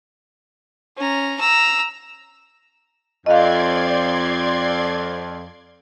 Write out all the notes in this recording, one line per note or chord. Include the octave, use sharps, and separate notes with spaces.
C#4 A#5
A#5 E6
F2 D5 D#5 F5 C6 G#6